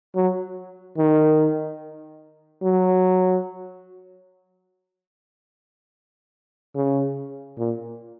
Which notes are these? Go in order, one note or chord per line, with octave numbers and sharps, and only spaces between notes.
F#3
D#3
F#3
C#3
A#2